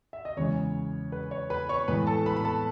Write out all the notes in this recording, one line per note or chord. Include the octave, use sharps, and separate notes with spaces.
E5
D#5
E2 C#3 E3 G#3 C#5
B4
C#5
B4 B5
C#5 C#6
A2 E3 G#3 B3 B4 B5
A4 A5
B4 B5
B5
A4 A5